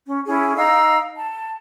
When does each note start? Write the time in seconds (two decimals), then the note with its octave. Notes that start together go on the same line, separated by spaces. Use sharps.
0.07 C#4
0.26 C#4 E4 G#4
0.56 D#4 F5 A#5 E6
1.17 A5